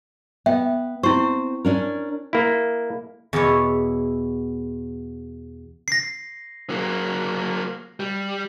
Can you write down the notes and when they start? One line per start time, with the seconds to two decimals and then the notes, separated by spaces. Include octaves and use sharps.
0.46 B3 E5 G5
1.03 C4 E4 C5 C#6
1.65 C#4 D4 A#4
2.33 A#3 E4
3.33 E2 B2 E4 C#5
5.88 A#6 C7
6.70 F#3 A#3
8.00 G3